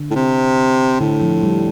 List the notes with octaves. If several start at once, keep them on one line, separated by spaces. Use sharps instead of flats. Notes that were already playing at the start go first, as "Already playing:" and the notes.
Already playing: D3
A2
C3
A2 D3
F3
G3